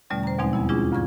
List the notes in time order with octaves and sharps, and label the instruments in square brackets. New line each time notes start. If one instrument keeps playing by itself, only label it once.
[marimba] E2 B2 D3 G3 A3 C#4
C5 A#5
D#2 B2 F3 G#3 C4 D#4
F2 G3 B3 E4
G#3 C#4 D4 E4 F4 G#4
D2 G2 D3 C#6 G#6